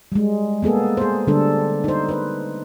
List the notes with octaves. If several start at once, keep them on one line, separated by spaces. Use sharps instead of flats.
G3 G#3
A#3 B3 G#4 A4
G#4 C5
D3 G3 D4 A4
D#4 C5
B4 C5